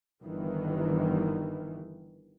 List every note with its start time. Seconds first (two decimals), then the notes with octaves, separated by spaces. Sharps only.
0.24 G1 D#3 E3